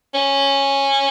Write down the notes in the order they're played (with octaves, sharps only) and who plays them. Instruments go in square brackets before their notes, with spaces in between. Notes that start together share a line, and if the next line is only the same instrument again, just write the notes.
[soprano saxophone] C#4